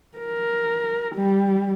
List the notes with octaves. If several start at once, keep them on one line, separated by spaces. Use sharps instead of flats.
A#4
G3